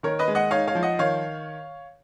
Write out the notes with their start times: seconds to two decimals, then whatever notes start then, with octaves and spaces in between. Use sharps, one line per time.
0.03 D#3 A#4 C#5
0.19 B4 D#5
0.28 G#3
0.35 D#5 F#5
0.51 D#4 C#5 F5
0.67 C#5 F5
0.75 F3
0.83 D#5 F#5
0.99 D#3 C#5 F5